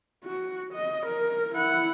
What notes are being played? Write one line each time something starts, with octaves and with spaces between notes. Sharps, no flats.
F#4
D#5
A#4
E4 F#5